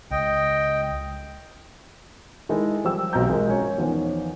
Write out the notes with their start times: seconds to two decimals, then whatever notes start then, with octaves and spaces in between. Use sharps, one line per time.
0.11 C#2 D#5 G5
2.49 D#3 G#3 D#4 E4 A4 D#5
2.85 F3 G3 G5 E6
3.13 E1 B1 C4 D#5 A#5 G6
3.27 G#1 F3 G#3 A#4
3.49 C#4 C#5 G#5
3.77 E2 D#3 F3 C#5